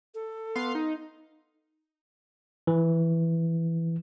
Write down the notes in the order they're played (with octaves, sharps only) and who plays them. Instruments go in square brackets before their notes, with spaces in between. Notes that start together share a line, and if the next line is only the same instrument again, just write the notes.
[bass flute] A4
[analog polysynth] B3 F5 C6
D#4
[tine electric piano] E3